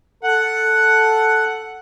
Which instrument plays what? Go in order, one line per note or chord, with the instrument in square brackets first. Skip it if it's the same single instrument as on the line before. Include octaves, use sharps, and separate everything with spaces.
[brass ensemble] A4 [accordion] F#5